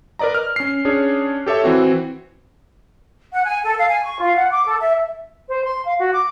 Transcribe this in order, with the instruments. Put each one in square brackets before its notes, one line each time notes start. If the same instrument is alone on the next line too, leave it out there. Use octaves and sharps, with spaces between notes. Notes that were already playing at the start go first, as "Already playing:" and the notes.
[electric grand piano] A#4 B4 D5 D#5 A#5
F6
C#4 C7
C#4 D4 G#4 C#5
G4 A4 C#5 E5
E3 C4 F#4
[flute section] F#5
G#5
A4
F5
G#5
C#6
F4
F#5
D6
A4
E5
[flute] C5
C6
F5
F#4
D6